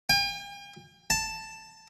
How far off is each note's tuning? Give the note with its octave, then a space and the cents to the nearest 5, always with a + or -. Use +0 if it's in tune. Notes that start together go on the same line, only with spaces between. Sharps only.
G5 +45
A5 +5